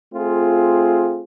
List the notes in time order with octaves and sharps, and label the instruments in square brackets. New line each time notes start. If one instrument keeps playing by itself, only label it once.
[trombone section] A3 C4 F4 G#4